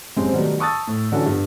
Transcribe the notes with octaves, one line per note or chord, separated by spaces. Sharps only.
F#1 C3 G#3 C4 C#4 C5
B2 D#3 F#3 G3 A3 B3
A5 C#6 D#6 E6 A6
A2
D3 E3 F#3 C#4 F#4 A4
G2 B3